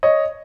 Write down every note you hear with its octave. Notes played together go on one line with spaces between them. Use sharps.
C#5 D#5